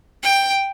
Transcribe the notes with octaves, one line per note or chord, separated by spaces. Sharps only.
G5